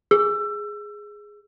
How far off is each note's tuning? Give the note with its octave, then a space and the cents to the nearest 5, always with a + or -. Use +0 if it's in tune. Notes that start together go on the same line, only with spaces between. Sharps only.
G#4 +0 E6 +25